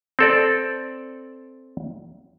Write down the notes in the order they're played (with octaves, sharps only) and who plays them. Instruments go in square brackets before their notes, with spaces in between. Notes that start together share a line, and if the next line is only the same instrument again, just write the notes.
[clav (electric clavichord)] C4 A4 D5